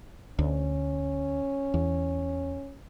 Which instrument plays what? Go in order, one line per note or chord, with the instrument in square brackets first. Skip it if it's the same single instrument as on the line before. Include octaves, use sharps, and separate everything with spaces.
[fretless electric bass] D2 [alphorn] C#4
[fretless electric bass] E2